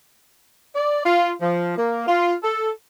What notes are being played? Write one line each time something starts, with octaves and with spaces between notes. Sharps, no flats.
D5
F4
F3
A#3
F4
A4